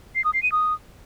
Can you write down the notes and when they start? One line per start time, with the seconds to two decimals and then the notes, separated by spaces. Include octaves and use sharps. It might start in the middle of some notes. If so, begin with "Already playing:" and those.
0.15 C7
0.24 D#6
0.34 C7
0.43 D#7
0.52 D#6